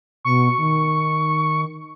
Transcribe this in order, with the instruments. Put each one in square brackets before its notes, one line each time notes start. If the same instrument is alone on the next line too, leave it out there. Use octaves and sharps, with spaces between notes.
[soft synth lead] B2 [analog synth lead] C#6
[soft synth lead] D#3